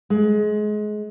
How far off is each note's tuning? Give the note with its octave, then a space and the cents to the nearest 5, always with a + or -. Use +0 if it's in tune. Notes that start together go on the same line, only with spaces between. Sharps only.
G#3 +25